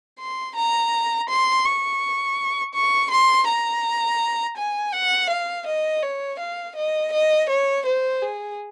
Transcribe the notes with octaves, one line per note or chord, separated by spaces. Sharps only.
C6
A#5
C6
C#6
C#6
C6
A#5
G#5
F#5
F5
D#5
C#5
F5
D#5
D#5
C#5
C5
G#4